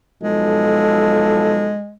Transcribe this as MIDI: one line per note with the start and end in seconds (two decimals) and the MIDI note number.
0.23 1.76 35
0.23 1.76 53
0.23 1.93 56
0.23 1.76 69